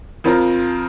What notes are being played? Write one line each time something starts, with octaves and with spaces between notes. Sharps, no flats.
F2 F3 C4 F4 A#4